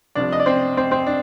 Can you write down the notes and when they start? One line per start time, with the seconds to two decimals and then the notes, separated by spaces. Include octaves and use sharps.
0.15 C2 C3 F3 D4 D5
0.32 D#5
0.40 D5
0.46 C4 C5
0.77 C4 C5
0.91 C4 C5
1.07 D4